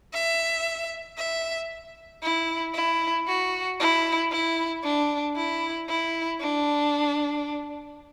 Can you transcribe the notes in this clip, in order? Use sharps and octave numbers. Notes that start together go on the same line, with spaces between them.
E5
E5
E4
E4
F#4
E4
E4
D4
E4
E4
D4